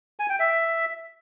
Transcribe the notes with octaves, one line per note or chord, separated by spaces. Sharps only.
G#5
G5
E5